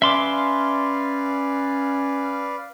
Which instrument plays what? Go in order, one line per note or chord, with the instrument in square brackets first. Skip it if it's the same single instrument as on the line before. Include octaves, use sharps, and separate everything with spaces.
[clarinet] C#4 [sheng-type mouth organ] B4 D5 F5 [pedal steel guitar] E5 C6 D6